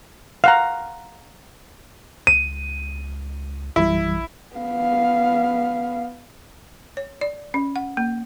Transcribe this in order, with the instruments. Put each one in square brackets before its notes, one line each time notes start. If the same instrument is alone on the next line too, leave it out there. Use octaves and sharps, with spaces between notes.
[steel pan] F5 F#5 A#5
[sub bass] C#2 [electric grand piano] D#7
[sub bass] A#1 [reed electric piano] F#2 E3 G3 [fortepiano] E4
[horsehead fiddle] B3 F5
[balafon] C#5
D5
C#4
F#5
A#3